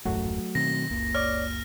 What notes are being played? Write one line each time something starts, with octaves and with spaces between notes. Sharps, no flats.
D#1 A1 F#2 F#3 A3 F#4
B2 D#3 C4 A#6
F#1 C#2 A#3
C#5 D5 D6 F6